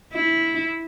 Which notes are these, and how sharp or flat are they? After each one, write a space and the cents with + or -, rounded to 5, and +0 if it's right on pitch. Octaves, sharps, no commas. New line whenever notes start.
E4 -10